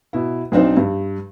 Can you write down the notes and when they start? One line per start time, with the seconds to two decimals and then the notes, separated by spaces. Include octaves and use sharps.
0.13 B2 E4
0.52 B1 C4 D4 D#4 C5
0.77 G2